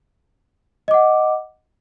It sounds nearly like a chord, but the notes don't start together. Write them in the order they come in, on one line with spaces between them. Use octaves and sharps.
D#5 D6 F#5